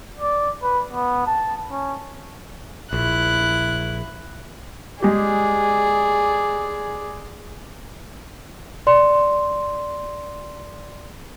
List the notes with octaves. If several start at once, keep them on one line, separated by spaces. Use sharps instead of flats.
D5
B4
B3
A5
C#4
A#1 E4 F#6
G#3 G4 G#4 D5
D5 C6